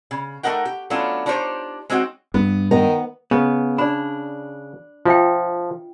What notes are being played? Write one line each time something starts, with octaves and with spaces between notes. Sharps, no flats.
C#3
A3 A#3 D#4 A#4 F#5 G5
G4
F#3 A3 B3 C#4 D4 F4
D4 D#4 F4 G4 C5 C#5
G#3 C4 C#4 D#4 F#4 G5
G2 B3
D#3 B3 A#5
C#3 B3
D4 D5 B5
F3 F4 E5 G5